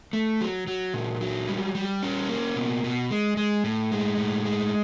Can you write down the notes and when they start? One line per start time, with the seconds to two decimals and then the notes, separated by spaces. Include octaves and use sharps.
0.13 A3
0.41 F#3
0.67 F#3
0.94 A#2
1.21 F#3
1.48 G3
1.75 G3
2.03 C#4
2.29 A#3
2.56 B2
2.84 B2
3.11 G#3
3.37 G#3
3.64 A2
3.91 G#3
4.18 A2
4.45 G#3